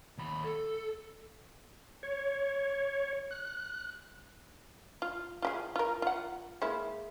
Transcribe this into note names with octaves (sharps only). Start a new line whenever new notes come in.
D#2 B5
A4
C#5
F#6
F4
F4 G4 G#4
F4 A#4
F4 F#5
G#3 A#3 E4